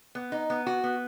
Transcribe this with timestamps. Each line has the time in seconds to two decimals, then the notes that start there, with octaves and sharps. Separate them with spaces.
0.15 B3
0.32 D#4
0.50 B3
0.67 F#4
0.84 B3